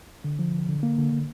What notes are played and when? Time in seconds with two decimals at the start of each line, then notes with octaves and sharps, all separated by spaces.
0.24 D3
0.39 F3
0.54 D3
0.68 D3
0.83 A#3
0.98 D3
1.12 D3